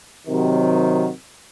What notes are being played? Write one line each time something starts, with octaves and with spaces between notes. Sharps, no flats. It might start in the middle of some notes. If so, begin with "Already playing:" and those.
C3 D#3 F#3